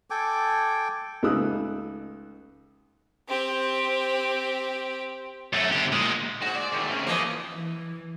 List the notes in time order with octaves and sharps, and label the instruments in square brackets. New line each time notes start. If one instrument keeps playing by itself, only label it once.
[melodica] A4 G5 G#5 D6
[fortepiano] C#2 A3 D#4 D#6 E6 F#6
[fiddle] C4 G4
[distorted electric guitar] F#2 A3
D3 G4
A#2 G#3
[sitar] G#2 [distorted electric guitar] F#4
[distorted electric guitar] D5
D#3 A3
C3 C#4
[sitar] E3 F3 [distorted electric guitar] A#3 D#5
[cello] E3